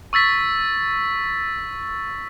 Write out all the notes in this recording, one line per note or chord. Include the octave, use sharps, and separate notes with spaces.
C#6 E6 A6 B6